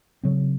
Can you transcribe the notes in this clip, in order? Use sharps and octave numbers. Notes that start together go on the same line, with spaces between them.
C#3 F#3 C4